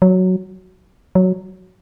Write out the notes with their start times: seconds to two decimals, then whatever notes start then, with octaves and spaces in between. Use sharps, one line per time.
0.02 F#3
1.15 F#3